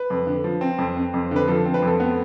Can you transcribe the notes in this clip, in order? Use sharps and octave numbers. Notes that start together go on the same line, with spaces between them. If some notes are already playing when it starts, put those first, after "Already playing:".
Already playing: B4
F2
D3
F3
C4
F2
C4
F2
D3 B4
F3 A4
C4
B4
F2 A4
B3